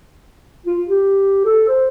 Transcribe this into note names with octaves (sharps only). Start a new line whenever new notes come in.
F4
G4
A4
C5